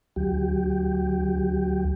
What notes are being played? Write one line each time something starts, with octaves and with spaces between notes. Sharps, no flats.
D2 F#3 G4